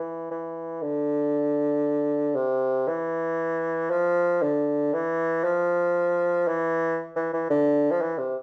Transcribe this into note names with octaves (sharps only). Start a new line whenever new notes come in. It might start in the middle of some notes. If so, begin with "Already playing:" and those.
Already playing: E3
E3
D3
C3
E3
F3
D3
E3
F3
E3
E3
E3
D3
F3
E3
C3